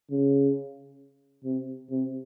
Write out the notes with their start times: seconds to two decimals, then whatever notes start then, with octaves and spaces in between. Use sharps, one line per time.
0.11 C#3
1.45 C3
1.91 C3